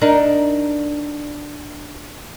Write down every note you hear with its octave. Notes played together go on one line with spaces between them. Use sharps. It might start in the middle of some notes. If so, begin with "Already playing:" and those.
D4 D#4 A#4